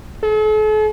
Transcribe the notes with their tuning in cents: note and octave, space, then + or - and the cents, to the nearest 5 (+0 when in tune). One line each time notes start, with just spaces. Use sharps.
A4 -45